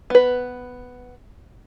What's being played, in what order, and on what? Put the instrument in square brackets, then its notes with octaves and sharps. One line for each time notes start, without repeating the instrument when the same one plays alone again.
[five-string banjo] B3 B4